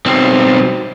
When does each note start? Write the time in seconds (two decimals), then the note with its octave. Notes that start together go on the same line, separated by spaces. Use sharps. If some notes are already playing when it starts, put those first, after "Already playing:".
0.06 B1 C4